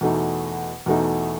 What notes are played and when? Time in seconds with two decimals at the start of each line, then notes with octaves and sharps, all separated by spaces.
0.01 E2 B2 A3 D#4
0.86 E2 B2 A3 D#4